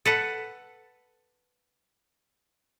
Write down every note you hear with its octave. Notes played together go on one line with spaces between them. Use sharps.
A4 B4 F#5